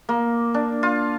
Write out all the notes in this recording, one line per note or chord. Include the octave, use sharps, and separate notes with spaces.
A#3
D4
F4